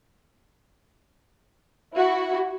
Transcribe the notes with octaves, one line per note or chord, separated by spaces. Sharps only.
E4 F#4